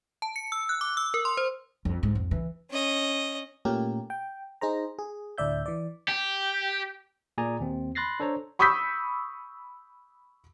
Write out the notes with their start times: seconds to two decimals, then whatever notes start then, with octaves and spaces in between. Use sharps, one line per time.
0.22 A5
0.36 C#7
0.52 E6
0.69 F#6
0.81 D6
0.97 E6
1.14 A#4
1.25 C6
1.37 C5
1.85 F2
2.03 G#2
2.15 F2
2.31 E3
2.71 C#4 D#5
3.65 A#2 A3 A#3 C#4 G4 A#4
4.10 G5
4.61 D#4 G#4 C5 A#5
4.99 G#4
5.38 D2 A2 D5 E5 G6
5.66 E3 D5
6.08 G4
7.38 A#2 G#4 D5 G#5 A#5
7.60 D#2 C4
7.95 B5 C6 F#6 A6 A#6 C7
8.20 D4 A4 C5 C#5 A#5
8.59 B5 C#6 D#6 E6 G6 B6